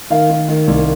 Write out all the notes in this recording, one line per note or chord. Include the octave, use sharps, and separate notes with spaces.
D#3 F5
D#3
D#3
C2